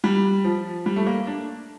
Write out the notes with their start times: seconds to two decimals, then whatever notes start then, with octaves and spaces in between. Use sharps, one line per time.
0.04 G3
0.44 F3
0.86 G3
0.96 A3
1.06 A#3
1.27 D4